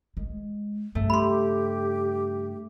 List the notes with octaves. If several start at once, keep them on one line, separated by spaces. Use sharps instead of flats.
G#3
G2 C#3 A3
G4 B5 C6